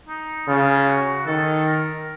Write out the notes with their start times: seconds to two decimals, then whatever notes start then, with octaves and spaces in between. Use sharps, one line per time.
0.08 D#4
0.48 C#3 F4
0.88 F#4
1.27 D#3 A4
1.66 A#4